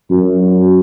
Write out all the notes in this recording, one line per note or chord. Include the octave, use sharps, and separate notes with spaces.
F#2